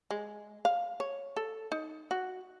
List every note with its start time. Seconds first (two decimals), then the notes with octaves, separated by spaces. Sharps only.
0.11 G#3
0.65 F5
1.00 C#5
1.36 A4
1.72 D#4
2.11 F#4